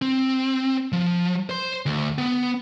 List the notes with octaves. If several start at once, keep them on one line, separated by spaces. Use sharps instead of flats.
C4
F3
C5 C6
D2
B3